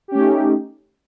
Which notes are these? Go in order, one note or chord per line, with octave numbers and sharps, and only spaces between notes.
A3 C#4 D#4 G4